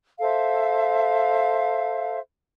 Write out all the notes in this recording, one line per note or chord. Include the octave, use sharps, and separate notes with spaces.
A4 C5 E5 F5